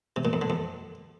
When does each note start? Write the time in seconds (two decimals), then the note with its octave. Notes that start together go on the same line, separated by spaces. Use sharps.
0.16 C3
0.25 A#2
0.33 F2
0.42 D3
0.50 F2